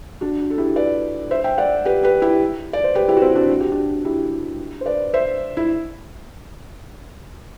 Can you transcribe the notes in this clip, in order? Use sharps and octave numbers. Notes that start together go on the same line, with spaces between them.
D4 F#4
A4
E4 G4
B4 D5
C5 E5
E5 G5
D5 F#5
G4 B4
G4 B4
E4 G4
D5
C5
G4 B4
E4 G4
F#4
C4 E4
D4 F#4
F#4
G4
D4 F#4
E4 G4
C5
B4 D5
C5 E5
E4